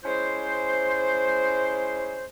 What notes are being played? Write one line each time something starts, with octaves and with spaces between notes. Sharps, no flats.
G#3 C#4 E4 C5